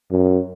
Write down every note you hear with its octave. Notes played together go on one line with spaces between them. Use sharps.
F#2